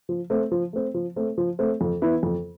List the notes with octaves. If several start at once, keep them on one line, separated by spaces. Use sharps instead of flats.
F3
A3 C4
F3
A3 C4
F3
A3 C4
F3
A3 C4
F2
E3 B3 E4 B4
F2